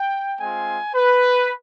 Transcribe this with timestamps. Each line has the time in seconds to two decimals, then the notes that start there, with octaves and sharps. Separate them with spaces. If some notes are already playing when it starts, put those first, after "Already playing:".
Already playing: G5
0.40 G#3 C4 F4 G#5
0.95 B4